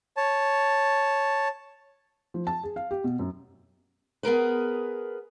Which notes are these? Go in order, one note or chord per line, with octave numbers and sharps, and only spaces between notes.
C#5 A5
F3
A5
G#4
F5
G4
B2
F#2
B3 G#4 A#4 B4